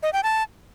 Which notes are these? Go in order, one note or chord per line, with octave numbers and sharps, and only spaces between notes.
D#5
G5
A5